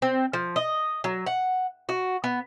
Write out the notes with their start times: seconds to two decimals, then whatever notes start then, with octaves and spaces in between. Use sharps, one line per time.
0.02 C4
0.33 F3
0.56 D#5
1.04 F#3
1.26 F#5
1.89 F#4
2.24 B3